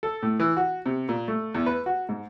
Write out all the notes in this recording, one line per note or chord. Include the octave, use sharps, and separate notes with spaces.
A4
A2
E3
F#4
C3
A#2
A3
E2
B4
F#4
G#2